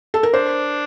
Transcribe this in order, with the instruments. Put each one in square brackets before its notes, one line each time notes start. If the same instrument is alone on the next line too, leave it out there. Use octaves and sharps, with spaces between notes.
[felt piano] A4
A#4
[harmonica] D4 [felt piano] C5